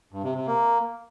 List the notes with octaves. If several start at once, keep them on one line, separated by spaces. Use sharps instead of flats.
G2
C3
C3
A#3